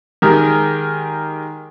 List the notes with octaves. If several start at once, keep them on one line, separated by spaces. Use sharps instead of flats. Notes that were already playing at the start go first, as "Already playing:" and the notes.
D#3 G#3 G4 G#4 A#4